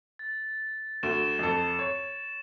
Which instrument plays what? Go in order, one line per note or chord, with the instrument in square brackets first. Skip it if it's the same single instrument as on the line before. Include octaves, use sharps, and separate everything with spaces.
[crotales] A6
[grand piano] D2 [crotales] E7
[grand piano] F2 A4
C#5